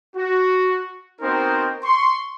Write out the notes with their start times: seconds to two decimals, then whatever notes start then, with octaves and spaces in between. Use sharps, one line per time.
0.16 F#4
1.21 B3 C4 D#4 F#4 A#4 C5
1.83 C6 C#6